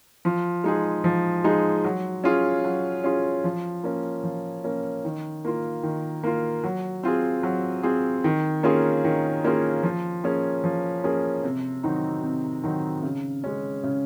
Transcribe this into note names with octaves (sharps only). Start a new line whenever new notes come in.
F3
G#3 D#4 G#4
F3
G#3 D#4 G#4
F#3
C#4 F4 G#4
F#3
C#4 F4 G#4
F3
A#3 C#4
F3
A#3 C#4
D#3
A#3 F4
D#3
A#3 F4
F#3
C4 F4 G#4
F#3
C4 F4 G#4
D#3
A#3 C#4 F4 G#4
D#3
A#3 C#4 F4 G#4
F3
A#3 C#4 G#4
F3
A#3 C#4 G#4
C3
D#3 F#3 C4 D#4
C3
D#3 F#3 C4 D#4
C#3
G#3 C#4
C#3